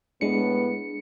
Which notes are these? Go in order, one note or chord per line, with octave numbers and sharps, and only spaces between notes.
A2 G#3 B3 D4 C#7